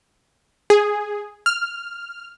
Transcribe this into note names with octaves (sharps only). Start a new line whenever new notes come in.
G#4
F6